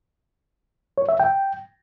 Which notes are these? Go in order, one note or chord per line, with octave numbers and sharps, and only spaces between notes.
C#5
E5
G5